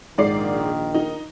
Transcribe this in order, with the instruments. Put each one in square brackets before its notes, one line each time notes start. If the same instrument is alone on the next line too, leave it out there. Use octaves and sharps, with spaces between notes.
[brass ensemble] A#1 D#3 [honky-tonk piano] G#2 D5 C7
[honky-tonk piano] D#4